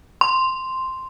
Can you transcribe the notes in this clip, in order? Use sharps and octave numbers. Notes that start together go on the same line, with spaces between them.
C6